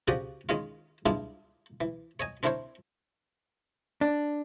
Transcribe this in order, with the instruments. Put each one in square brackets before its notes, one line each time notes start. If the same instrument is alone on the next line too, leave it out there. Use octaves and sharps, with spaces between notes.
[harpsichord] C#3 F3 F#4 G4 D5 D#6
D#3 G#3 C#4 F4
G2 G#3 D4 E4 F4
E3
C#5 D#5 G#5
C4 D4 E4 A#4 C5 C#5
[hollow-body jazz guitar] D4